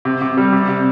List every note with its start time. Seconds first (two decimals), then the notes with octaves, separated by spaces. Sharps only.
0.05 C3
0.22 C3
0.37 G3
0.52 C3
0.69 C3